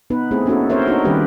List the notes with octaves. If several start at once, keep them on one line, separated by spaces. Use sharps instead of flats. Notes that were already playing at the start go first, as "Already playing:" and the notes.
B3 D#4 B4
A3 C4 E4 G#4
A#3 C#4 D#4 F#4 A4
C4 A#4 C5 C#5 E5
D4 D#4 F#4
D#3 G3 C#4 D4 G4 B4